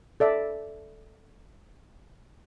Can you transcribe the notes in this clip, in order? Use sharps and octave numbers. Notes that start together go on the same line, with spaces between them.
A4 D5 E5